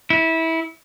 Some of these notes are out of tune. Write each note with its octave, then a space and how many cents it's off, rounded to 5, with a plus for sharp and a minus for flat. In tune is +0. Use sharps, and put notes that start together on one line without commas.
E4 -20